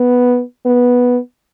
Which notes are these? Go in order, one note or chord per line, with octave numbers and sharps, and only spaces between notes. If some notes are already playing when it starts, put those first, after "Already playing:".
Already playing: B3
B3